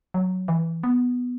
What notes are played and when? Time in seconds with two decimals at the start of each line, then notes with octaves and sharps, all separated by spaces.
0.14 F#3
0.48 E3
0.83 B3